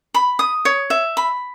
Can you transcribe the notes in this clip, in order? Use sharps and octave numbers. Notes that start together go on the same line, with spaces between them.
B5
D#6
C#5
E5
B5